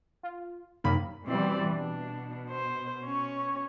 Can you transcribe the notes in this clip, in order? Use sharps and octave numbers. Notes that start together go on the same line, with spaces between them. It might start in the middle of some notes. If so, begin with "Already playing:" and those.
F4
F#2 C3 D#3 A#3 B5
B2 E3 G3 C4 D5
B2 D4
C5
C#4 C#5